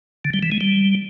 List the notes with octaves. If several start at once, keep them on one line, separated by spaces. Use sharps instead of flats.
D3
G3
E3
G#3
G3